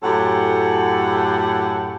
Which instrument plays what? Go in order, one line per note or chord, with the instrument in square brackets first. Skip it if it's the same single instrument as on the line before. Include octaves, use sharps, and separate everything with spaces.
[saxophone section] F#2 A2 G4 A4 F#5